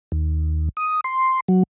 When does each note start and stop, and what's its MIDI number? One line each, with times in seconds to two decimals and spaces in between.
0.12 0.69 39
0.77 1.01 87
1.04 1.40 84
1.48 1.63 54